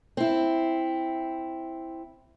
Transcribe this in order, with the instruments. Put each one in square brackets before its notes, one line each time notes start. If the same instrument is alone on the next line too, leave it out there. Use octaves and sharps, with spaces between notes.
[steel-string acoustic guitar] C4 E4